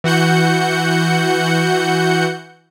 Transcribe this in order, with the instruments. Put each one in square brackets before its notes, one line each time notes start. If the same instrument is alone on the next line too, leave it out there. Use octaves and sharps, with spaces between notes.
[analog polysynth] E3 F#4 F#5 G6 C#7